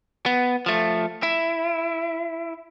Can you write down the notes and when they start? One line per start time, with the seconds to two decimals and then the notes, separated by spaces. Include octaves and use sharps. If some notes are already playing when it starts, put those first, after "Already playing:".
0.26 B3
0.66 F3 A3
1.23 E4